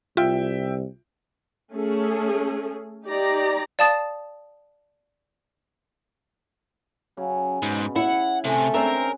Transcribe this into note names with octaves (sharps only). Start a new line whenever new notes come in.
C2 F4 E5 G5
A3 C#4 G#4 A4
D#4 G4 D5 A#5
D5 F5 A5 D#6 A6 E7
C#3 F#3
G#2 B2 B5
E4 F#5
C3 A3 C#4 G#4
G#3 C4 D4 A#4 E5